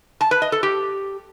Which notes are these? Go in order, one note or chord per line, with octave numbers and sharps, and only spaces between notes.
A5
B4
D#5
A4
G4